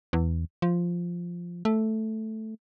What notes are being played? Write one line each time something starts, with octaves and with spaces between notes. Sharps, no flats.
E2
F3
A3